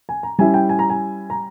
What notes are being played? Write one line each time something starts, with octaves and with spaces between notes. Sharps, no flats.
G#5
A#5
G3 C#4 E4 G#5
G5
G#5
A#5
G#5
A#5